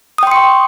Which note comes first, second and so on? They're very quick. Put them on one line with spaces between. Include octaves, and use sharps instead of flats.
D#6 G5 C6 C#7 C#6